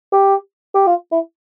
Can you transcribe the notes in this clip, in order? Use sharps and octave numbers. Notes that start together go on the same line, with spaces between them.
G4
G4
F4
E4